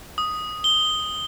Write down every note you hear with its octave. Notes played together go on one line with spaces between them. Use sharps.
D#6
G7